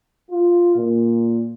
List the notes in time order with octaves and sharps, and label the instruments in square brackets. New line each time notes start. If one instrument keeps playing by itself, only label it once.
[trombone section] F4
A#2